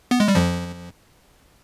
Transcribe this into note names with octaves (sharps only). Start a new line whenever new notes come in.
B3
G#3
G3
F2 F3